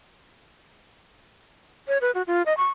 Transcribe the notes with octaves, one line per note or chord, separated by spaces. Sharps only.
C#5
B4
F#4
F4
D#5
C#6